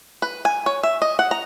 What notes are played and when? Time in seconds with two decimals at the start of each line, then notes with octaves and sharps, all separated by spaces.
0.22 B4
0.45 G#5
0.66 C#5
0.83 E5
1.02 D#5
1.19 F#5
1.31 A#5